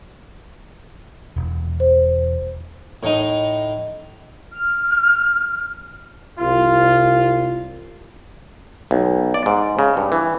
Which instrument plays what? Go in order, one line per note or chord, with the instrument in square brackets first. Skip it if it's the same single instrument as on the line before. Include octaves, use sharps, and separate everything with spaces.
[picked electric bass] E1
[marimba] C5
[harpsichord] A2 D#4
[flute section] F6
[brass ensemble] C2 F4
[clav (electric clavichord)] B1
D5
G#2
C#3
G2
E3